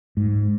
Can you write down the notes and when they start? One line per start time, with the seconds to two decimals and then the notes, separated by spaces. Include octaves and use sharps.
0.17 G#2